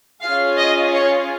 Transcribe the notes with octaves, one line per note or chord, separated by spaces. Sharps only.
C#4 F4 G#4 F5
D#5
C#5